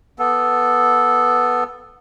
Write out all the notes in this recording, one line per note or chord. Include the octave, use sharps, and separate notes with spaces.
B3 A4